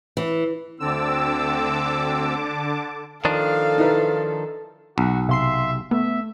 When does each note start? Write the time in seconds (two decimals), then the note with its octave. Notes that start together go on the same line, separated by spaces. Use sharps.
0.17 E3
0.80 D2 D3 C4 A5 D6 E6
3.25 D#3 F3 D4 A4 F5
3.78 D#4 E4 B4
4.98 B1 F#4
5.29 C3 E5 F5 C6 C7
5.91 A3 B3 E5